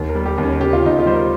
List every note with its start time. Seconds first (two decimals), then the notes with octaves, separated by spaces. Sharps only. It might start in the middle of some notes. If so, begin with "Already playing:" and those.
Already playing: D#2
0.09 A#4
0.15 G3
0.26 G4
0.38 D#2
0.43 C#4
0.60 C#3 G4
0.73 F4
0.84 D#2 D#4
0.98 F4
1.06 G3 C5
1.14 A#4